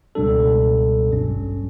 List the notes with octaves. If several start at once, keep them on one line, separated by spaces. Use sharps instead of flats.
C#2 B2 G3 D4 A4
A1 G2 F#3 C#4